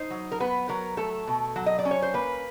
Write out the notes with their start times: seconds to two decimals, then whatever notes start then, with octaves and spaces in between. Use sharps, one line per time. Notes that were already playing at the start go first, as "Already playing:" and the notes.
Already playing: D#4 C5
0.10 F#3
0.32 A#4
0.40 B3 B4
0.69 F#3 A#4
0.97 A3 A4
1.27 B2
1.56 F#3
1.66 D#5
1.79 D5
1.85 C#4
1.91 C#5
2.02 C5
2.14 A#3 B4